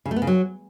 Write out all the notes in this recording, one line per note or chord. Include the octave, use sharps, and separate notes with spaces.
C#3
A3
B3
C#3
F#3